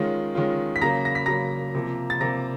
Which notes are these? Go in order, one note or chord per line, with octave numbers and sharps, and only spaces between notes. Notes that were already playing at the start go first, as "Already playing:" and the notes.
Already playing: D#3 G#3 C#4 F4
D#3 G#3 C#4 F4
B6
C#3 F#3 A#3 A#5 A#6
A#6
B6
C#3 F#3 A#3 A#5 A#6
C3 F3 A#3
A6
C3 F3 A#3 A#5 A#6